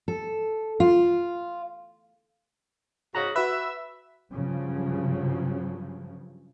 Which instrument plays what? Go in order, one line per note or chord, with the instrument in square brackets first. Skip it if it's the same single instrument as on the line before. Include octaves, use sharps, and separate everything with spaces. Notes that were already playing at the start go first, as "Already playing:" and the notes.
[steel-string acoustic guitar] A4
F4
[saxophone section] G#2 C#3 F#4 [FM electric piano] A#5
[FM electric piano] F#4 B4 [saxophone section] E5
[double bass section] G2 C#3 F3 F#3